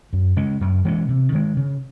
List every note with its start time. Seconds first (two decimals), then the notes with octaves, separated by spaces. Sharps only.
0.13 F#2
0.36 C#3 G#3 C#4
0.61 F#2
0.85 E3 G#3 C#4
1.09 C3
1.32 D#3 G#3
1.57 C#3